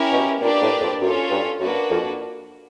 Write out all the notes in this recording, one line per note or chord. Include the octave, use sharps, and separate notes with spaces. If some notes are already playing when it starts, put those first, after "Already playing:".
Already playing: C#4 E4 G4 A#4
B2
A#2 A#3 D4 G4 B4 D5
A2
F2
F#2 C#4 F4 A4 C#5
G2
F#2 A#3 D4 F#4 B4
F2